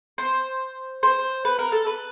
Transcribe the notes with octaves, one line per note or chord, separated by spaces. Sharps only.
C5
C5
B4
A#4
A4
B4